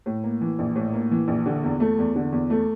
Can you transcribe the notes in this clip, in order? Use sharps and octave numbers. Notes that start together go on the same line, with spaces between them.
A2
A#3
E3
A#1
A2
A#3
E3
A#1
D3
E2
A3
E2
D3
E2
A3